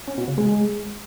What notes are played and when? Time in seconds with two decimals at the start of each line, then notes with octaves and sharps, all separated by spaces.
0.07 C#4
0.18 B2
0.28 C#3
0.38 G#3